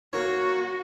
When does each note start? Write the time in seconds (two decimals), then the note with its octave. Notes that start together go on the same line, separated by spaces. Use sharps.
0.13 A#3 F#4 A#4 C#5